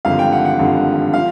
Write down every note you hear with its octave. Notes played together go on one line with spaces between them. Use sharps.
G#1 G2 D3 F3 F5
G5
F#5
F#5
G#1 G2 D3 F3
F3 F5